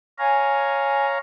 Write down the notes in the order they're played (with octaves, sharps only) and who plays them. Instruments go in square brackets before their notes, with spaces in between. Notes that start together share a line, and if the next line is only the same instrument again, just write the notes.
[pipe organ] C#5 F5 A#5 [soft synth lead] G#5